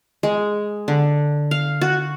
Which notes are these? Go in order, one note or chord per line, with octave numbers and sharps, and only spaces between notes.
G#3
D3
F5
F#4